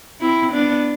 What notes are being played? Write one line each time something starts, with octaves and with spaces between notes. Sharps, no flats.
C4 E4
B3 D4